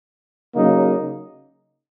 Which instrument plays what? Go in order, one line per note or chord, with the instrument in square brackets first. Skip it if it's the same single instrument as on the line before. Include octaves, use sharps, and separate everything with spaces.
[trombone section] C#3 F#3 A#3 D#4